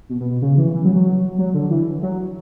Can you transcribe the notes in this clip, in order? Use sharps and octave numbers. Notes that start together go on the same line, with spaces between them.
B2
B2
B2
C#3
E3
E3
F#3
F#3
F#3
D3
E3
F#3